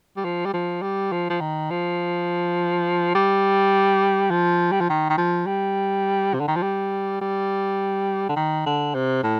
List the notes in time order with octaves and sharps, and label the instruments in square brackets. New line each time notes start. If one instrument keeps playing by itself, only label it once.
[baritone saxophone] G3
F3
G3
F3
G3
F3
F3
D#3
F3
G3
F3
G3
F3
D#3
D#3
F3
G3
C3
D3
D#3
F3
G3
G3
D3
D#3
D3
C3
A2